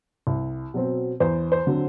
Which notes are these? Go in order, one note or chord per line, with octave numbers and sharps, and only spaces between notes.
C2
B2 F#3 C4
E2 C5
C5
D3 F#3 C4